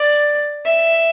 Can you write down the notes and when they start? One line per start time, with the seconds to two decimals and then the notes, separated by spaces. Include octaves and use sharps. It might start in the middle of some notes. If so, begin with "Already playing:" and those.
Already playing: D5
0.65 E5